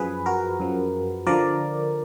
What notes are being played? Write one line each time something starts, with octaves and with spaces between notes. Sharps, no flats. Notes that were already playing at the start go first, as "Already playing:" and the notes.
Already playing: F#2 F3 G#4 B4
F#4 A#4
F#2 F3
D3 F3 A#4 D5